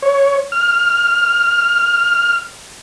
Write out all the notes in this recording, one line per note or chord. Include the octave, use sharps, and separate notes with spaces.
C#5
F6